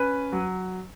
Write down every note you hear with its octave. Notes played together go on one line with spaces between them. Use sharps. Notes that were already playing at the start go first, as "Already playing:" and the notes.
Already playing: C#4 B4
F#3